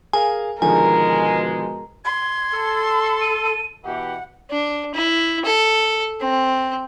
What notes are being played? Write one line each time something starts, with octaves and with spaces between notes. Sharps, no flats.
G#4 A#4 F5 G#5
B2 D3 D#3 F3 G#3 A#4 G#5
C6 G#6
A4
D#7
B2 E3 G4 F#5
D4
E4
A4
C4